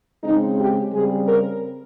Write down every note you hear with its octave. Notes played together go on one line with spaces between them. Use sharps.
C#3 G#3 C4 D#4
G4
C#3 G3 C4 G#4
A#4